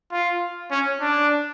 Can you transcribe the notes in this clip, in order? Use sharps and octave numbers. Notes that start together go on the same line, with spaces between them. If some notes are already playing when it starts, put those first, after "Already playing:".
F4
C#4
D4